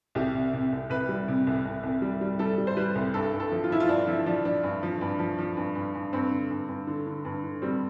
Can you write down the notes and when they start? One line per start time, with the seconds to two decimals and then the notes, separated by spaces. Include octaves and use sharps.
0.15 C2 G4
0.34 C3
0.53 C3
0.72 C2
0.90 C2 B4
1.09 G3
1.28 C3
1.47 C2
1.65 C2
1.83 C2
2.02 G3
2.21 G3
2.39 G3 A4
2.58 G3
2.67 C5
2.77 G3 B4
2.95 C2
3.14 G2 A4
3.33 G2
3.40 A4
3.52 F3
3.64 F4
3.70 F3 E4
3.80 F4
3.88 G2 D4
4.07 F3 E4
4.26 F3 D4
4.45 F3 D4
4.63 G2
4.83 F3
5.01 G2
5.19 F3
5.39 F3
5.57 G2
5.75 G2
5.95 G2
6.13 G2 C4
6.31 D3
6.51 G2
6.68 G2
6.87 D3
7.06 D3
7.25 G2
7.44 D3
7.62 G3 C4